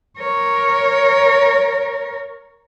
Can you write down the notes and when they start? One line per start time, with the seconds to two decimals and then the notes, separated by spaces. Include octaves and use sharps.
0.18 A#4 C#5